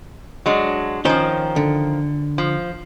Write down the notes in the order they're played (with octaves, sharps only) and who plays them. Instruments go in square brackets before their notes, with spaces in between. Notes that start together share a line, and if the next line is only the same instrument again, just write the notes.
[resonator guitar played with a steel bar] F#3 G#3 D4
[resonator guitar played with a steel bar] D#3 F3 [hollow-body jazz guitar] C#4 C5
[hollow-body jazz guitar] D3
[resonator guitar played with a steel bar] F3